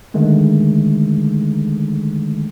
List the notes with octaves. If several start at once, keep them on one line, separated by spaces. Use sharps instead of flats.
D3 D#3 G#3 A3